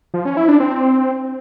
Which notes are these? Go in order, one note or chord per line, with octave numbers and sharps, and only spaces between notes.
F3
C#4
E4
D4
C4